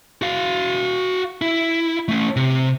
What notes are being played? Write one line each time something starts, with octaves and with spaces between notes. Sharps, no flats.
F#4 F5
E4
A3 C#4
C3